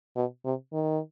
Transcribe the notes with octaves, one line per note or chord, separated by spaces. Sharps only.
B2
C3
D#3